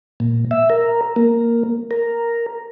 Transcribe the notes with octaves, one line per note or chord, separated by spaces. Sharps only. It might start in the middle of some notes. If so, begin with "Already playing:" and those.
A#2
E5
A#4
A#3
A#4